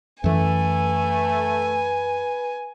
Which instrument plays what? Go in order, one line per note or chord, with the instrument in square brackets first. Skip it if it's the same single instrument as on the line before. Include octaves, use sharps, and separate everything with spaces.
[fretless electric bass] F#2 E3 [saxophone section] A3 [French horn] B4 [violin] G#5